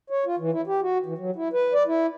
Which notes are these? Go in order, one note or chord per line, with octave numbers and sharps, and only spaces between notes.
C#5
F4
E3
E4
G4
F#4
E3
F#3
E4
B4
D5
E4